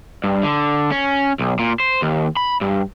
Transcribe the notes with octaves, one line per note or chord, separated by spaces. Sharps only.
G2
D3
C#4
B1
A#2
C5
D#2
B5
G2